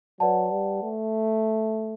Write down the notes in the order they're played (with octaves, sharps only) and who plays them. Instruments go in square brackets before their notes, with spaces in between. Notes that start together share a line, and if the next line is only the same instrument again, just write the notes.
[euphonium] F#3 [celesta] B4 D5 F#5 A5
[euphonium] G3
A3